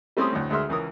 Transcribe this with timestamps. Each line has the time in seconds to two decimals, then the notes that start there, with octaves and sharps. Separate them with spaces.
0.17 G3 A3 C4 C#4 C6 D#6
0.33 D2 A2
0.50 D2 G#3 G#4 E5 C6 F6
0.69 C#2 E3 C#4 A#4 D#6